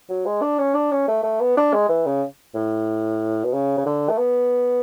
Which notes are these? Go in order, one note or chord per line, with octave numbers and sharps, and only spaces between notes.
F#3
G#3
D4
C#4
D4
C#4
A3
A3
B3
D4
G#3
E3
C#3
A2
B2
C#3
C#3
D3
A3
B3